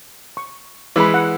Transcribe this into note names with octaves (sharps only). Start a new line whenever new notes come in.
C#6
E3 G#3 B5 D6
F#5